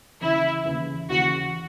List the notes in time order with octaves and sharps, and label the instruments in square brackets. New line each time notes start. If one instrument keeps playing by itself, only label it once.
[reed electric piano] D#2 C#3 E3 [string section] E4
[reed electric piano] D#2 C#3 E3
[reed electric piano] D#2 C#3 E3 [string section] F#4